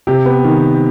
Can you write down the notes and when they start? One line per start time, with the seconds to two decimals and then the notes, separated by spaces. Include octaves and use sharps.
0.07 C3 G4
0.26 B3
0.44 D#3